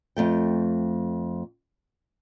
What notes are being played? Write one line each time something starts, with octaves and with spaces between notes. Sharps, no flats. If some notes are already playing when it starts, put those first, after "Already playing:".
F2 A3 G5